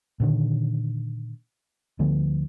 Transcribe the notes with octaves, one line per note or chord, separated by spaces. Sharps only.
A#2 D3 D#3
D2 D3 F3 B3